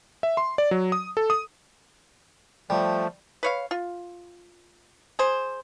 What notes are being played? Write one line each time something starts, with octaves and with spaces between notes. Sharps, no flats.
E5
C6
D5
F#3
D#6
A4
D#6
F3 G3 A3
B4 C#5 F5
F4
G#4 C5